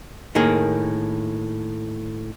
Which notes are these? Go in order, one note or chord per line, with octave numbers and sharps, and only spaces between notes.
A2 D#3 A#3 G#4